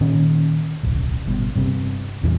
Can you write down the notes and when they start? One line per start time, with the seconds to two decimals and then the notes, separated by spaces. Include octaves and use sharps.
0.01 A#2 D#3 C#4
0.83 D1 B1
1.26 G1 G2 B2
1.56 G2 C3
2.23 E2 G2 A#2 E3